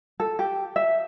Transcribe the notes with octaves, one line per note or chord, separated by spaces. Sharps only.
A4
G4
E5